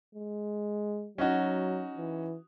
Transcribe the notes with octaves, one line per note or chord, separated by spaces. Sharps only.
G#3
F#3 C#4 D#4 F#4
E3